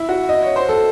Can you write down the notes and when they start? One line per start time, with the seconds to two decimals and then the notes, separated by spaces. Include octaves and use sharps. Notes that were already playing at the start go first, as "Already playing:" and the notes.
Already playing: E4
0.09 F#4
0.29 D#5
0.42 C#5
0.56 C5
0.69 A4